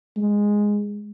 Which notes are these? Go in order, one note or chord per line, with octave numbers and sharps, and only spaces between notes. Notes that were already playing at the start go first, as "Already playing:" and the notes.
G#3